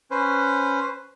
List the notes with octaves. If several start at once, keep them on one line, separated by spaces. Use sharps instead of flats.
C#4 B4 C5